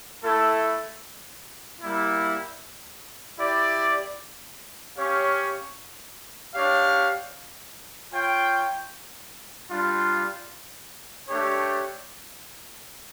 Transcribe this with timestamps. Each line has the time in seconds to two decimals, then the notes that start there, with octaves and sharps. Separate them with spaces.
0.23 A3 E4 A4
1.81 G3 A#3 E4
3.38 E4 G4 D5
4.96 C#4 G4 C#5 F5
6.54 D4 G4 C#5 F5
8.12 F4 C#5 G5
9.70 G3 D4 F4
11.28 A3 D4 G4 C#5